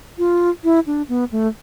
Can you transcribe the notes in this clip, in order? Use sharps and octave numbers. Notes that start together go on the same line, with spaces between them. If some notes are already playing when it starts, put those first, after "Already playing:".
F4
E4
D4
B3
A3